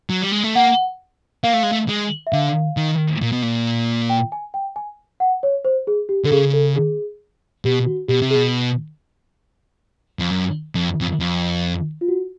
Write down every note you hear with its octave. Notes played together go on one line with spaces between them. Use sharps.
F#3
G3
G#3
A3
A#3 F#5
A#3 F5
A3
G#3
A3
G#3
E5
D3 F5
D#3
A#2
B2
A#2
G5
G#5
G5
G#5
F#5
C#5
C5
G#4
G4
D3 A4
C#3 G#4
A4
G#4
B2 G4
F#4
B2 G4
C3
G#4
B2
F2
F#2
F2
F2
F2
F4
F#4